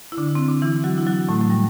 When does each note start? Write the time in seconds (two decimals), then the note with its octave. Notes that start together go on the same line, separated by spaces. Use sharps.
0.12 E4
0.17 D3 D4
0.35 C4
0.49 D4
0.62 E3 E4
0.84 F#3 F#4
0.98 E4
1.07 F#3 F#4
1.29 A2 A3
1.41 F#3
1.50 G3